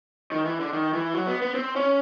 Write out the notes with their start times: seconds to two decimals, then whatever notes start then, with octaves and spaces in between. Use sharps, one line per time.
0.32 D#3
0.45 E3
0.60 D3
0.73 D#3
0.93 E3
1.14 F#3
1.27 B3
1.42 B3
1.55 C4
1.76 C#4